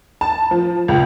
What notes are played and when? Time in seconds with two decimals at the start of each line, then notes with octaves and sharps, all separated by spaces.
0.21 A5
0.51 F3
0.88 C#2